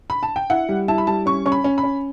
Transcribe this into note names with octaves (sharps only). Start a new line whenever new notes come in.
B5
A5
G5
E4 F#5
G3
E4 A5
B5
G3 A5
C#4 C#6
C#4 C#6
B5
C#4
B5
C#4